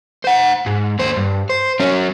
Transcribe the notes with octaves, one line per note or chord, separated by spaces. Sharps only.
C5 F#5
G#2
D#2 C5
G2
C5
F#3 C#4